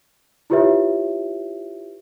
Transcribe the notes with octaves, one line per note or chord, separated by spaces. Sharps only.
E4 F4 G4 B4 C#5 E5